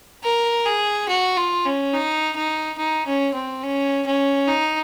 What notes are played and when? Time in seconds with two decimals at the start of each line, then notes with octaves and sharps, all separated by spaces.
0.24 A#4
0.66 G#4
1.08 F#4
1.37 F4
1.65 C#4
1.93 D#4
2.36 D#4
2.78 D#4
3.06 C#4
3.34 C4
3.62 C#4
4.06 C#4
4.48 D#4